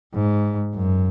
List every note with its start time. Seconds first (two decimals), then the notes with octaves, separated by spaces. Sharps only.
0.14 G#2
0.74 F#2